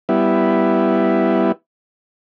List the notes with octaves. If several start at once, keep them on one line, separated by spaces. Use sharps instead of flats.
G3 B3 E4